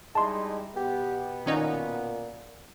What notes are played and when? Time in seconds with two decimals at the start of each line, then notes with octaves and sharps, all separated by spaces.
0.15 G3 G#3 D#4 E4 A5 C6
0.76 B2 B3 G4
1.46 A#2 D#3 C#4 D#4